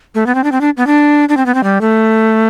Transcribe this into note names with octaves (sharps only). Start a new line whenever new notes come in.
A3
B3
C4
D4
C4
D4
B3
D4
D4
C4
B3
C4
G3
A3